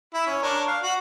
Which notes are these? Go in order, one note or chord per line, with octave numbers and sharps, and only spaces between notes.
E4
C#4
D4 A#4 C#5
F5
F#4